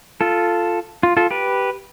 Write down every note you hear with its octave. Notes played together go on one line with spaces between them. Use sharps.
F4 A4
F4
F4 A4
G4 B4